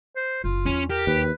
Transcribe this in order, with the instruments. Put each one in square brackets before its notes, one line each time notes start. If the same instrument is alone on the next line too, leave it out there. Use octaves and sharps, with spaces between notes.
[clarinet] C5
[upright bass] F#1 [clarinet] F4
[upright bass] E2 F3 [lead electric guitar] C#4
[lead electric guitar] G4 [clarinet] A#4
[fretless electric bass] D#2 [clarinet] B4